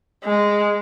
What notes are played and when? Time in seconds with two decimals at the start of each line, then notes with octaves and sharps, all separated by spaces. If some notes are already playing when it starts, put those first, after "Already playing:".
0.24 G#3